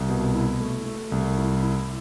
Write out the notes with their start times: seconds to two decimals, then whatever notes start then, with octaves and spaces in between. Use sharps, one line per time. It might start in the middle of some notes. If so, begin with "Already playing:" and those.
Already playing: C2
0.09 B2
0.35 E4
0.60 A3
0.86 A3
1.12 C2
1.38 E4
1.63 E4